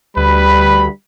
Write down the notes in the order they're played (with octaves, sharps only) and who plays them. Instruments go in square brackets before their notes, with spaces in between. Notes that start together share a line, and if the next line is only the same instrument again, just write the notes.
[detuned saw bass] D2 [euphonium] G3 [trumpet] B4 [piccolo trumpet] B5